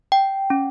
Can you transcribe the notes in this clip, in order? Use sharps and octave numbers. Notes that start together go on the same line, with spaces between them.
G5
C#4